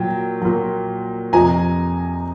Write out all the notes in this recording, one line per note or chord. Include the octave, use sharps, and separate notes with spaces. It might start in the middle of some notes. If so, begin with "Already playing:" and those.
Already playing: A#2 F#3 G5
A#2 F#3
F2 C3 F3 G#5 A#5